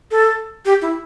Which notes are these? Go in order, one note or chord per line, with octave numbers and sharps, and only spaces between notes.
A4
G4
E4